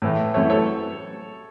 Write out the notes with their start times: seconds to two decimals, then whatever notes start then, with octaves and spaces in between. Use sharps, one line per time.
0.02 A2 E3 A3
0.34 F#2 E3 A3 C#5 E5
0.50 A4 C#5